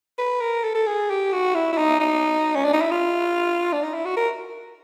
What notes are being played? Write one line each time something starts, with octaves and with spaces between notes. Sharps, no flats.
B4
A#4
A4
A4
G#4
G4
F#4
E4
E4
D#4
D#4
C#4
D4
D#4
E4
F4
D4
D#4
E4
F#4
A#4